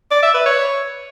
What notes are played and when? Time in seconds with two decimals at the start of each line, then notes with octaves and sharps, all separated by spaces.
0.11 D5
0.23 E5
0.34 B4
0.46 C#5